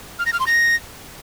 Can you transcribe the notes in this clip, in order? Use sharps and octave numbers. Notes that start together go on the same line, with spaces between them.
F6
A#6
F6
C6
A#6